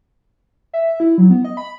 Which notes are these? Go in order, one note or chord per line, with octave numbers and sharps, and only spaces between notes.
E5
E4
F#3
B3
D#5
B5